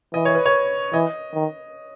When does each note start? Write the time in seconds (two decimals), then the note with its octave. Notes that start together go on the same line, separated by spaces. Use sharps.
0.14 E3 D#5
0.25 C#5
0.35 B4
0.46 C#5
0.93 E3 D#5
1.34 D#3